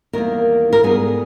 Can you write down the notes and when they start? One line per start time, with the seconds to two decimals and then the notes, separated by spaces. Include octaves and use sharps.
0.13 E2 D#3 G3 A#3 A#4
0.73 A#4
0.83 G#2 G3 B3 G#4